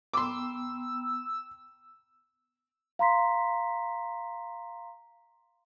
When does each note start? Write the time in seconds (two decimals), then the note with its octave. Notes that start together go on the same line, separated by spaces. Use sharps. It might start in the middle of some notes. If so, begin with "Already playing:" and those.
0.14 B3 G5 A#5 C6 D6 E6
2.99 F5 A#5 C6 B6